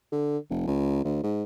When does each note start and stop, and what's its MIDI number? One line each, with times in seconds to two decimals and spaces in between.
0.12 0.38 50
0.50 0.66 29
0.67 1.01 37
1.04 1.21 38
1.23 1.44 44